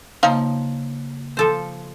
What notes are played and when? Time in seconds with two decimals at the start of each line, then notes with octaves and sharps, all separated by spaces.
0.23 C#3 F3 A#3 D#4 F5
1.37 F3 A4 C5